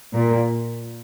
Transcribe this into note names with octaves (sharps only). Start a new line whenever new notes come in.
A#2